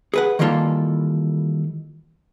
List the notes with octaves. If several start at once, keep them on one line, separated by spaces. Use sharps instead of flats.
G#4 B4 F#5
D#3 E3 G3 A#3 F4 A4